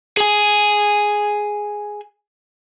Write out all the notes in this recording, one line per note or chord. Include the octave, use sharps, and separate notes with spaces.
G#4 G#5